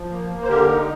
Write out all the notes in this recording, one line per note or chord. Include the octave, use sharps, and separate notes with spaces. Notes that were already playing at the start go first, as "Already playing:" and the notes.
Already playing: F3
A#3
A#3
C5
D3 G4 A#4
D#4